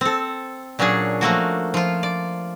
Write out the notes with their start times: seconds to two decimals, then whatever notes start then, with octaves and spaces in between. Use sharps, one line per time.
0.01 C4 A4
0.79 A#2 F#3 C#4 D4 G#4
1.21 F3 A3 A#3 F#4
1.74 F3 F4
2.03 D5